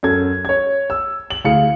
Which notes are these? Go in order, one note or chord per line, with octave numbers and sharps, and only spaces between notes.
F#2 A4 G#6
C#5 G#6
E6
F#7
D2 E4 G#4 F5 C#7